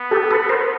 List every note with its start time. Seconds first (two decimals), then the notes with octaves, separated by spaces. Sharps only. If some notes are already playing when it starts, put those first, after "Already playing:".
Already playing: B3
0.11 G4 A4
0.31 A4 B4
0.49 A#4 C5